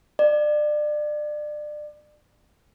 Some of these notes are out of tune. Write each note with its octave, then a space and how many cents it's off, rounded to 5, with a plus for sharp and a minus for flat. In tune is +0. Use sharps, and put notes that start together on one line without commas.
D5 +30